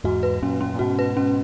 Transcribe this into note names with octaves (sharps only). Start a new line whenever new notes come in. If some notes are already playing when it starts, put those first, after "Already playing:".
E2 G#2 F#4
B4
F#2 A#2 C#4
C#4
A#2
G#2 B2 F#4
B4
C#4